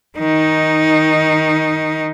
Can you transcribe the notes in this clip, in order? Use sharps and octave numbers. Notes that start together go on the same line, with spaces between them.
D#3 D#4